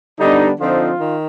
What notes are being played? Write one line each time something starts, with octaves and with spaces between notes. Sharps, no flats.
D3 G3 B3 D4 D#4
D3 F3 C4 D#4 F4
D#3